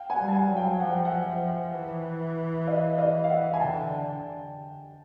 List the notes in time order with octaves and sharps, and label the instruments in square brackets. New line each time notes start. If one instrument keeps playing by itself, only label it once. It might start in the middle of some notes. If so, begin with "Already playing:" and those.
Already playing: [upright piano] F5 G5
F#5 G#5
[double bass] G3
[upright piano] A5
F#5 G#5
[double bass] F#3
[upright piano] F5 G5
[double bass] F3 [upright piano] F#5
[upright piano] G5
E5 F#5
[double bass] F3
E3
[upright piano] D#5 F5
D#5 F5
F5
E5 F#5
G#5
[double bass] D3 [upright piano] G5 A5